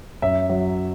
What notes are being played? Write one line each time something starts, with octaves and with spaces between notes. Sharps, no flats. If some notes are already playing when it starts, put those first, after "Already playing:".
F#2 E5
F#3